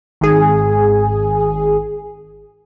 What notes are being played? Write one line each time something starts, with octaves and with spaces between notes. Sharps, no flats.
G#1 G#4